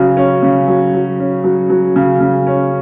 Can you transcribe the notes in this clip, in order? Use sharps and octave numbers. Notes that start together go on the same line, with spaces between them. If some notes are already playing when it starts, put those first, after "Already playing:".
Already playing: C#3 F#3
C#4
C#3
F#3
F#3
C#4
F#3
F#3
C#3
C#3
C#4